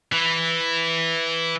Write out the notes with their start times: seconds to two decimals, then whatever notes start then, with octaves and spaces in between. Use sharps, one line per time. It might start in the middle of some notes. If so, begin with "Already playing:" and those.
0.12 E3